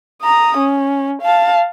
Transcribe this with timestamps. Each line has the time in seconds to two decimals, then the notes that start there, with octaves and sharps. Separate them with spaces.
0.22 A#5 D#6
0.58 C#4
1.22 F5 A5